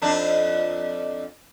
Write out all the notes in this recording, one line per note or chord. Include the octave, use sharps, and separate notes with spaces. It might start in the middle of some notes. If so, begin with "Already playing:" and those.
F2 D4 D#4